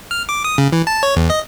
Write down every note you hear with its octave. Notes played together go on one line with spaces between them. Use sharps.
F6
D6
D#6
C#3
E3
A5
C#5
E2
D#5